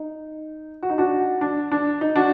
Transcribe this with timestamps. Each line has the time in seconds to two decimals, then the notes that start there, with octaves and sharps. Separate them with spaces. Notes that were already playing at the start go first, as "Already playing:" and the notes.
Already playing: D#4
0.83 F#4
0.90 D#4
0.98 D4 F#4
1.41 D4
1.71 D4
2.01 D#4
2.16 D4 F#4